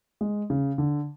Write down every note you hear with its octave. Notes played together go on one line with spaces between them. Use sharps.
G#3
C#3
D3